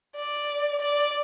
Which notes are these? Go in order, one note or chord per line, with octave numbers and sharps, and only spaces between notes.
D5
D5